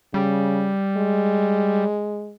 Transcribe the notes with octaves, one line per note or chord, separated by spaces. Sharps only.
C#3 G3
G#3